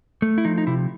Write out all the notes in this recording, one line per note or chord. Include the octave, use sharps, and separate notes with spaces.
A3
E4
F3 D#4
D#4
C3 E4